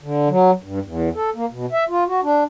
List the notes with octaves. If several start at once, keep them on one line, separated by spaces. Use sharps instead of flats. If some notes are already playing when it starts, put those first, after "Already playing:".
D3
F#3
G2
E2
A4
A#3
B2
E5
F4
F#4
D4